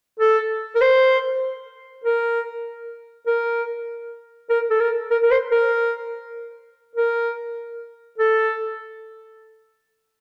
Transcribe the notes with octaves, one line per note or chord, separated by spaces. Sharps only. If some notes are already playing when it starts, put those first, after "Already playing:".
A4
A#4
C5
A#4
A#4
A#4
A4
A#4
A#4
A#4
C5
A#4
A#4
A4